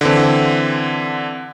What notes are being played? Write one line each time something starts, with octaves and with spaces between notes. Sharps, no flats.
D3 E3 C4